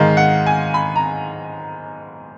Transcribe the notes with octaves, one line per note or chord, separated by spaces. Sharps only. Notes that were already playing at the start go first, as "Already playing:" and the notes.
Already playing: G#2 D#3 G#3 F5
F#5
G#5
B5
A#5